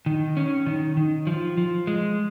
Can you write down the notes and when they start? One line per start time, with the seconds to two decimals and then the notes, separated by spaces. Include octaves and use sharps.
0.06 D#3
0.37 C#4
0.67 D#3
0.97 D#3
1.27 F3
1.57 F3
1.87 G#3